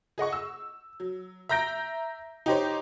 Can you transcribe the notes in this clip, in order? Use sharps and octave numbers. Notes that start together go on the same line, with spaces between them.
G#4 D#5 F#5 C#6
E6
F#3
E5 A#5 G6 A#6 D7
D#4 G4 C5 C#5